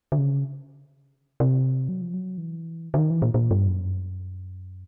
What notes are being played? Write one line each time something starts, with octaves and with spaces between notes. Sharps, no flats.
D3
C#3
C3
F#3
F3
F#3
E3
D3
D#3
E3
A#2
A#2
G2
F#2